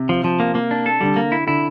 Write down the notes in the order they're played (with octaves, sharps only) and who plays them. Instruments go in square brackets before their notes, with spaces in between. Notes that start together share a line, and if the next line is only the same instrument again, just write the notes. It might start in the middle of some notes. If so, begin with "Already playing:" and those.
Already playing: [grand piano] C3
[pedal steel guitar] F3
F3
A#3
A#3
D4
A4
[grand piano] D3 [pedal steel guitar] G3
[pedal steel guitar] A#3
E4
[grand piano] D3 [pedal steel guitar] E4